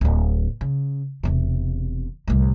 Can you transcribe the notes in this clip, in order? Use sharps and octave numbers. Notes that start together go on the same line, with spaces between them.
D1 D3
C#3
E1 C3
C2 A2